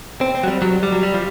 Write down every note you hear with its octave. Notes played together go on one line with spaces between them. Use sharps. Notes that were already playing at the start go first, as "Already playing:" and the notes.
C4
C4
F#3
G3
F#3
G3
F#3
G3
F3